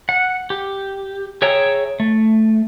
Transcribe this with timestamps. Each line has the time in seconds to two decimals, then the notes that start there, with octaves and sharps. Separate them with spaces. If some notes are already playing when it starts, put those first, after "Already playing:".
0.09 F#5
0.50 G4
1.42 G#4 C#5 E5 G5 A#5
2.00 A3